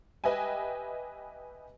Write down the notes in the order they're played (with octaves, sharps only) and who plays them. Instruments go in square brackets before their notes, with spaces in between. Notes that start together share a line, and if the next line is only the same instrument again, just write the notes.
[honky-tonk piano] G4 B4 D#5 E5 G5 G#5